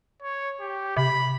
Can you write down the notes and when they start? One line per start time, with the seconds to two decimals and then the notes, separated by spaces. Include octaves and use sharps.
0.22 C#5
0.60 G4
0.97 C3 B5